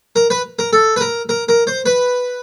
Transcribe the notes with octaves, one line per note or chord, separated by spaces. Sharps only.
A#4
B4
A#4
A4
B4
A#4
A#4
A#4
C5
B4